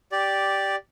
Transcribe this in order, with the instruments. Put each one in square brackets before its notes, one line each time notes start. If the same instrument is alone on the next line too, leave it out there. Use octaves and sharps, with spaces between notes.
[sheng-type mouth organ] G4 D5